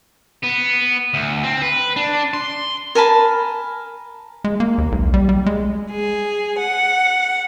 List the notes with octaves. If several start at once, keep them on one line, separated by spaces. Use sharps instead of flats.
B3
D2
C4
B4
D4
C6
A#4 G#5 A5 B5
G#3
A#3
D#2
B1
G3
G3
G#3
G#4
F#5